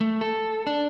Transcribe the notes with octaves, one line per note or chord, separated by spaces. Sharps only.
A3
A4
D4